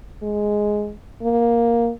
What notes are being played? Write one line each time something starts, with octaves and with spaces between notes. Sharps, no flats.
G#3
A#3